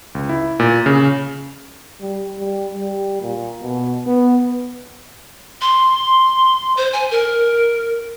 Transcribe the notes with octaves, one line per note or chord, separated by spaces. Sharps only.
C#2
E4
A#2
C#3
G3
G3
G3
A#2
B2
B3
C6
C5
G#5
A#4